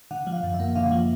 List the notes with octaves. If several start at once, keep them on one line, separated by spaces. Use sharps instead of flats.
D3 F#5
F3
F5
F#2
E5
A#3
D3 F5
F3